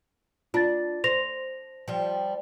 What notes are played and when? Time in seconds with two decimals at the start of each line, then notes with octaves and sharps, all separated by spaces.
0.54 D4 F4 A6
1.04 C5 A#6 F7
1.88 F3 G3